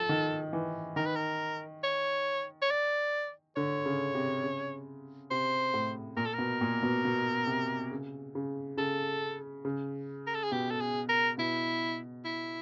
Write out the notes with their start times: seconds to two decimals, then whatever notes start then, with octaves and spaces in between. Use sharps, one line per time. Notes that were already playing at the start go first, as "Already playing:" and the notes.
Already playing: F3 A4
0.09 D#3
0.53 E3
0.96 D#3 A#4
1.06 B4
1.16 A#4
1.84 C#5
2.62 C#5
2.70 D5
3.56 D3 C#5
3.86 C#3
4.15 C3
4.44 C#3
5.30 C3 C5
5.74 A2
6.17 A#2 A#4
6.25 A4
6.33 A#4
6.38 B2
6.61 A#2
6.83 B2
7.05 B2
7.47 C3
7.91 C#3
8.35 C#3
8.77 C#3 A4
9.65 C#3
10.27 A#4
10.34 A4
10.44 G#4
10.52 B2 G4
10.70 A4
10.81 G#4
11.09 A#4
11.38 B2 E4
12.25 E4